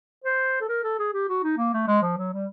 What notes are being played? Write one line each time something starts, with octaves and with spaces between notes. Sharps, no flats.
C5
A4
A#4
A4
G#4
G4
F#4
D#4
A#3
A3
G#3
F3
F#3
G3